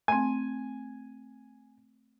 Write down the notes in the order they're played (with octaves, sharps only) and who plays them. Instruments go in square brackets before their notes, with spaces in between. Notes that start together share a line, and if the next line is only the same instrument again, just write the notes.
[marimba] A3 C4 [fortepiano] G#5